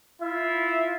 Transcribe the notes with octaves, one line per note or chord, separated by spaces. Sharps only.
E4 F4 E5